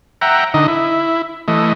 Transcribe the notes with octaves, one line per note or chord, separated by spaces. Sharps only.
E5 F#5 G5 A#5
D3 D#4 D#5
E4
E3 A3 D#5